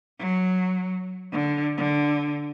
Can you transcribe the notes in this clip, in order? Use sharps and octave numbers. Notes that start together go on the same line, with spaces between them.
F#3
D3
D3